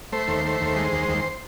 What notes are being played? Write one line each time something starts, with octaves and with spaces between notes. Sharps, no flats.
A3 C5
D#2
A3
D#2
G#3
D#2
D#2